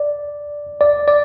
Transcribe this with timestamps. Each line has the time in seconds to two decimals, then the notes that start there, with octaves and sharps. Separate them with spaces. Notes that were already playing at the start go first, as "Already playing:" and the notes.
Already playing: D5
0.81 D5
1.08 D5